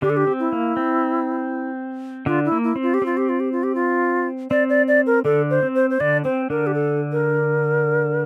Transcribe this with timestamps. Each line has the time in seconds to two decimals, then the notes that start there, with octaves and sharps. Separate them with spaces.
0.02 D3 D4 G4
0.10 A4
0.17 G4
0.27 C4
0.40 E4
0.52 A#3
0.77 C4
2.26 D3 D4 F4
2.45 E4
2.52 A#3
2.64 E4
2.76 C4
2.83 F4
2.94 G4
3.02 C4 F4
3.17 G4
3.29 F4
3.40 G4
3.52 F4
3.63 G4
3.75 F4
4.51 C4 D5
4.69 D5
4.88 D5
5.06 A#4
5.25 D3 D4 A4
5.50 C5
5.63 C4
5.75 C5
5.90 C5
6.00 D3 D4 D5
6.24 C4 C5
6.50 D3 D4 A#4
6.67 G4
6.74 A4
7.12 A#4